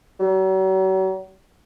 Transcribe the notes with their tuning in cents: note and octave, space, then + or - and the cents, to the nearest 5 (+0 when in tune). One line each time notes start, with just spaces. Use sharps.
F#3 +40